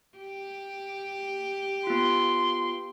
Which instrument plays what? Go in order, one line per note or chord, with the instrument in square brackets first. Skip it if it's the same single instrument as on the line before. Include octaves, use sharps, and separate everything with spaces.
[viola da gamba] G4
[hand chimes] B3 F4 [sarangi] C6